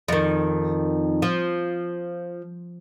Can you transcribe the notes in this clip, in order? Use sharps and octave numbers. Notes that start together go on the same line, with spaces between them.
F2 D#3
F3